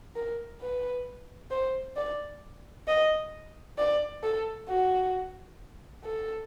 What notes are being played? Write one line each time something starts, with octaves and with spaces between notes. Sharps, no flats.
A#4
B4
C5
D5
D#5
D5
A4
F#4
A4